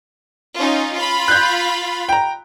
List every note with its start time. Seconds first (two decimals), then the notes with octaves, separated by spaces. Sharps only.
0.57 C#4 D#4 F4
0.96 F4 B5
1.28 F#6 G6
2.09 G5 A#5